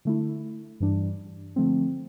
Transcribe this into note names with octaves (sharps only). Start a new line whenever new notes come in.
D3 A3 E4
G2 E3 G3 D4
D3 F3 A3 C4